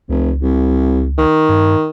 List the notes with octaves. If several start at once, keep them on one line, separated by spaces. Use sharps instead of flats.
F1 C#2
C2
D#3
G2